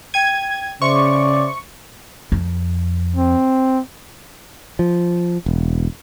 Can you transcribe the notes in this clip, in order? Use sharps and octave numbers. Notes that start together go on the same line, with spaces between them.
G5 G#6 D#7
C#3 C5 D5 E5 C6 C#6
F2
C4
F3
E1